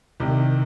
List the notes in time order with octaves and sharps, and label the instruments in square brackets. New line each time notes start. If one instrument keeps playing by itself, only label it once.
[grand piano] C2 C3 D#3